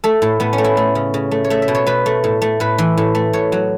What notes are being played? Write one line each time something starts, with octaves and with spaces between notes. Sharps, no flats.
A3 A4
A2
A2 B3
C#4
A3
E4
A3
C#3
C#3
A3
C#5
A3 E5
E5
B2
C#5
B2 B4
A3
A2
A3
A2 B4
E3
A2
A3
A2 C#5
F#3